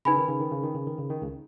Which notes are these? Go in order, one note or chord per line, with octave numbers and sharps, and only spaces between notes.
C#3 D#4 B4 G#5 B5
D#3
C#3
D#3
C#3
D#3
C#3
D#3
C#3
D#3
C#2 C#3